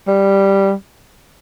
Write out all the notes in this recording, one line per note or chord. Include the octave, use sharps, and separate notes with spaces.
G3